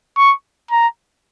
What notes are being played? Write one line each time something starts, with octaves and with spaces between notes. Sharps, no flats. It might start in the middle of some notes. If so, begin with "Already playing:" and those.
C#6
A#5